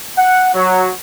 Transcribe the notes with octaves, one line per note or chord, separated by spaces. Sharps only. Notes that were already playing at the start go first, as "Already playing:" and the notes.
F#5
F#3